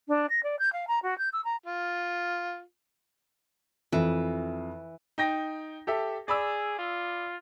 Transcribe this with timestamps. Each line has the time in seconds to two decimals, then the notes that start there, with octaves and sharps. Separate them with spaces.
0.08 D4
0.29 A#6
0.43 D5
0.59 G6
0.72 F5
0.87 A#5
1.02 F#4
1.18 G6
1.32 E6
1.44 A#5
1.66 F4
3.92 F2 E3
5.18 D#4 G5 A#6
5.87 G4 A4 E5
6.28 G#4 D5 B5 E6
6.79 F4